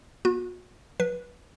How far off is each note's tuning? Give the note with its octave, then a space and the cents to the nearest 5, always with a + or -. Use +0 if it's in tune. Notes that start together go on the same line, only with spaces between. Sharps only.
B3 -45 F#4 -40
F3 +35 B4 -20